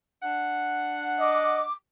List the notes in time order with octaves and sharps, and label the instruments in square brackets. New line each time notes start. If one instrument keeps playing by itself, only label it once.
[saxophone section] D4 F#5
[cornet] D#5 [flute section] D6